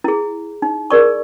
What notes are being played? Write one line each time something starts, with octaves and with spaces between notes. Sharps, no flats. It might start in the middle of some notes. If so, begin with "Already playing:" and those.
E4 G#4
D#4
G#4 A#4 D5 C#6